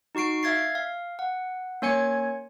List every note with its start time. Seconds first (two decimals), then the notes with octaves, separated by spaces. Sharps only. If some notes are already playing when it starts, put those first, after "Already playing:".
0.15 D#4 F#4 C#6 C7 D7
0.43 E5 F5 G#6 A6 C7
0.75 F5
1.19 F#5
1.82 A#3 C#4 C#5 G#5 G#6 C#7